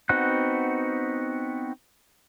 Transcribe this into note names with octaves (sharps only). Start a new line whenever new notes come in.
B3 C4 D#4 F#4 F#6